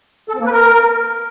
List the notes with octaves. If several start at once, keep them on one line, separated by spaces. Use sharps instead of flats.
A4
C4
A#3
B4
A#4